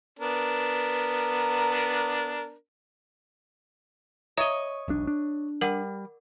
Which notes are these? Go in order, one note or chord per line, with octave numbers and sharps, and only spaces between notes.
B3 D4 A#4
C#5 D#5 E5 A#5 D#6
E1 B1 D4
D4
G3 A#4 F#5